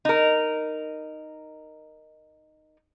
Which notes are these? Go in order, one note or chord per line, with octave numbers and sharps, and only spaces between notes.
D#4 A#4